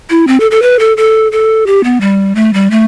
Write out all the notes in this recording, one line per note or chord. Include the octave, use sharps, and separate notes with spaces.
E4
C4
A4
A4
B4
A4
A4
A4
G4
B3
G3
A3
G3
A3